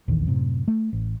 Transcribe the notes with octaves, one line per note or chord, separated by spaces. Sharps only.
D1 A#1 E2 D#3
F#2 A2 C3
A3
A1